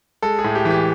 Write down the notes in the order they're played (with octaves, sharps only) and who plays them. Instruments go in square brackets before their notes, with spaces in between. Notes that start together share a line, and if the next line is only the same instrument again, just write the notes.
[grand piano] G#3 A4
G#4
A2
G4
E3
G4